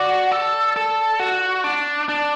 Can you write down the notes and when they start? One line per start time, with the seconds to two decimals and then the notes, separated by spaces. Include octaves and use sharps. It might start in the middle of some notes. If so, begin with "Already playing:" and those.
Already playing: F#4 D5
0.32 A4
0.76 A4
1.19 F#4
1.64 D4
2.08 D4